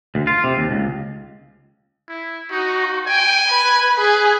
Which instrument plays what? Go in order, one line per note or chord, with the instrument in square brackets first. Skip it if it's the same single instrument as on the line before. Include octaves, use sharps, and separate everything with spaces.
[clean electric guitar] D2
F4
C3
D#2
C#2
[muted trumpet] E4
[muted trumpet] D#4 [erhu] F#4
[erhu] G5 [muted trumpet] G#5
[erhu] B4
[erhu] G#4 [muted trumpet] B4